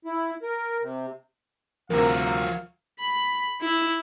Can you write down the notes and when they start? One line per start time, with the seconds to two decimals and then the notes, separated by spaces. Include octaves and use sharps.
0.05 E4
0.43 A#4
0.82 C3
1.90 D2 C3 F3 F#4 A#4 F5 A#5
3.00 B5
3.61 E4